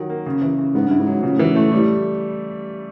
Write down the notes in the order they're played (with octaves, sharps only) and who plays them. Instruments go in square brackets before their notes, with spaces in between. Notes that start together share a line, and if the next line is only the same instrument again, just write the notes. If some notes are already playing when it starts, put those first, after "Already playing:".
Already playing: [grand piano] D#3 F#3
A#3
C#3
E3
C#3
[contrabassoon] G#2 [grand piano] B3
[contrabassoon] G2 [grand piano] E4
[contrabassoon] G#2
[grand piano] F#3
[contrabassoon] A#2 [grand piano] C#3
[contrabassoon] A2
[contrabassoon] G#2 [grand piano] E3
[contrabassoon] A2 [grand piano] A3
[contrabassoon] A2 [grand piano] G3